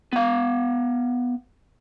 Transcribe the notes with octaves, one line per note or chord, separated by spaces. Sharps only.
B3 F5